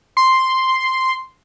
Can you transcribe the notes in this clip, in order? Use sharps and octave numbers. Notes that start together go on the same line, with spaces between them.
C6